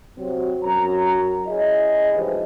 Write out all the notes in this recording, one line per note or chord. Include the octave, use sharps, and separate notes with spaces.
C3 F#3 C4
F#2 A#5
C#4 E4 G#4 D#5
D2 G#2 E3 F3 G4